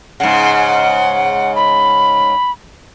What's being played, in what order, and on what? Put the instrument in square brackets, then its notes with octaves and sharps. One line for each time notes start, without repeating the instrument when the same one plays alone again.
[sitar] G#2 C#3 [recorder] F#5
[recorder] B5